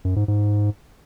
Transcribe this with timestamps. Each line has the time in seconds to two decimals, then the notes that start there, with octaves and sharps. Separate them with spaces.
0.05 F#2
0.16 G#2
0.28 G#2